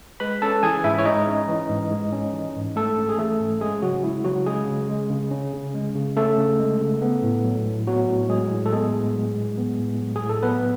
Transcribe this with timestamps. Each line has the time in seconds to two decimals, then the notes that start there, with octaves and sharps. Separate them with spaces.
0.20 G#3 B4 B5
0.42 C#4 A4 A5
0.63 E3 G#4 G#5
0.84 G#2 E4 E5
0.98 C#5
1.05 G#3 D#4 D#5
1.27 C#4
1.48 E3
1.69 G#2
1.91 G#3
2.12 C#4
2.33 E3
2.55 G#2
2.76 G#3 A3 A4
2.97 C#4
3.09 G#4
3.18 E3 A3 A4
3.40 G#2
3.61 G#3 C#4 G#4
3.82 C#3 F#3 F#4
4.03 G#3 E4
4.25 C#3 F#3 F#4
4.46 G#3 C#4 G#4
4.68 C#3
4.89 G#3
5.10 C#3
5.31 C#4
5.53 C#3
5.74 G#3
5.95 C#3
6.17 A3 C#4 A4
6.38 C#3
6.59 G#3
6.81 C#3
7.02 B3
7.23 A2
7.45 F#3
7.66 A2
7.87 F#3 B3 F#4
8.08 A2
8.29 F#3 G#3 G#4
8.50 A2
8.65 A4
8.72 G#3 B3 G#4
8.93 A2
9.15 F#3
9.36 A2
9.58 B3
9.79 A2
10.00 F#3
10.16 G#4
10.21 A2
10.29 A4
10.42 F#3 B3 B4